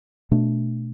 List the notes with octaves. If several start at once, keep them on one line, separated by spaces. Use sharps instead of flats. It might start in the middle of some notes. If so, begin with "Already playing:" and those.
B2 A3 D4